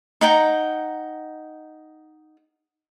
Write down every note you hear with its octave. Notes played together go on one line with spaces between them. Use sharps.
D#4 F#5 G5 A#5